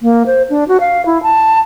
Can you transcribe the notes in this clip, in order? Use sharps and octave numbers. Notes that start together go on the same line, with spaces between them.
A#3
C5
D4
F#4
F5
E4
A5